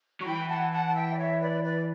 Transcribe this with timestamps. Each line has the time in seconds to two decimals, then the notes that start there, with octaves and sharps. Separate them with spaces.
0.20 F#3 C#6
0.25 E3 G5 B5
0.48 F#5 A5
0.71 F#5 A5
0.87 A5
0.95 E5 G5
1.13 D5
1.18 C#5 E5
1.41 B4 D5
1.64 B4 D5